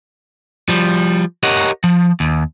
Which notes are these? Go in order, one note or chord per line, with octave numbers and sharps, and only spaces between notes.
F3 G3
G4 A#4 C#5 D#5 F#5
F3
D#2